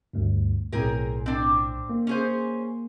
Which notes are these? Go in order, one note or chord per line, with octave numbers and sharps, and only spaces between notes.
D2 G2
B1 A2 C4 G#4 A#4
C4 D4
A#3
C#4 G#4 C5